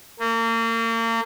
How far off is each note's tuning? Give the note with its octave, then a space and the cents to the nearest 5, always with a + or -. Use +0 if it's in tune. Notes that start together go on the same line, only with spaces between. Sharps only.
A#3 -35